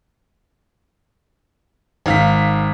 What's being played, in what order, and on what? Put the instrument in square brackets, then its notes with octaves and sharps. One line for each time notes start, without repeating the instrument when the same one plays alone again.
[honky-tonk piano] G#1 F5 B6